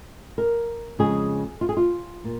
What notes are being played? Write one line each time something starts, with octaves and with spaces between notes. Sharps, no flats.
A#4
F2 C#3 G#3 G#4
F4
G#4
F4
A#2